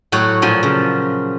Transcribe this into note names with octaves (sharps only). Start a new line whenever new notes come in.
A2 F#3 F#4 C#5 F#5
A#2 F3 F#3 G#5
C#3